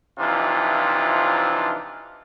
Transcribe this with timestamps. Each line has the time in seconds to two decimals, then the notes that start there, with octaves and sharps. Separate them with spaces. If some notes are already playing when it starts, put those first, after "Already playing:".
0.19 C3 E3 F3 D4 D#4 F4